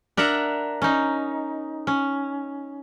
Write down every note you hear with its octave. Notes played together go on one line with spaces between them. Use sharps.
D4 A#4 E5 F#5 A#5
C#4 D#4
C#4